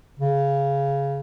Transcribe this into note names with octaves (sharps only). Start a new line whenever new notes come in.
C#3